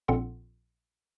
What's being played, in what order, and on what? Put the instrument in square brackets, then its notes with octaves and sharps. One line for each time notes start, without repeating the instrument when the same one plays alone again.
[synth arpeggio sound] A#1 A#2 C4 A4 F#5 C6